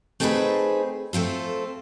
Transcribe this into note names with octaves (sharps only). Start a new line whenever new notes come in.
A3 C4 D#4 G4 G#4 B4
A3 C4 F4 A4